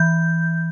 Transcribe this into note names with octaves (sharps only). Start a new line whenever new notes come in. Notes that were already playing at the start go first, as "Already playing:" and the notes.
Already playing: E3 G6